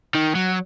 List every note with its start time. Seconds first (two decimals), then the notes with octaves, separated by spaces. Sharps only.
0.15 D#3
0.35 F#3